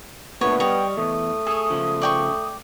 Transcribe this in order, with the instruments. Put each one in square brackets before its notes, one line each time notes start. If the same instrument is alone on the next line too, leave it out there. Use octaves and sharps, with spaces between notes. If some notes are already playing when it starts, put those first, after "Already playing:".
[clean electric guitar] A#2 D3 A3 [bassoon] B3 [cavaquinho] C#5
[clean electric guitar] G3 [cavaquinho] C#5 D#5 [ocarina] G5
[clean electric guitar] E2 [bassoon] A3 [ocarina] D#6
[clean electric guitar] G#4 [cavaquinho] A4 C#5
[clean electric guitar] C#3 F3
[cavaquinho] D5 G5 C#6